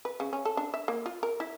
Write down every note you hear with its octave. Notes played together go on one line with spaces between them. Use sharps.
B4
C#3
C#4
A4
D4
E5
A#3
F4
A#4
E4